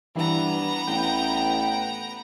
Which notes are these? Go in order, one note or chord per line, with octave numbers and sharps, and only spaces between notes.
G2 E3 B3 A#5
A1 G5